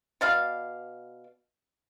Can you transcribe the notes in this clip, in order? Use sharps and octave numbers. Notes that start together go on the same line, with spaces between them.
B2 D5 F5